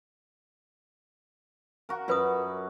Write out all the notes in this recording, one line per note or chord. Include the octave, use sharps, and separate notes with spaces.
F#4 A#4
F#2 F4 B4 B5 D#6